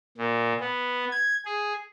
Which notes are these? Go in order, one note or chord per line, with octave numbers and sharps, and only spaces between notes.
A#2
B3
G#6
G#4